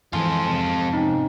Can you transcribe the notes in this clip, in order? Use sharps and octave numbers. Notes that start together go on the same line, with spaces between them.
F2 G#2 E3 F4 A4 G#5 C6
C3 A5
C4 C#4 D#4